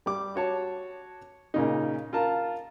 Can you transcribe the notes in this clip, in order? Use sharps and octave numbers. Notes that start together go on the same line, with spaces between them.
G3 D6
F#4 C#5 A5
A#2 C#3 D#4
F4 A#4 A5 A#5